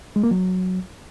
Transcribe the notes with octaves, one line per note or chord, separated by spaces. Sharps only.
G#3
A#3
F#3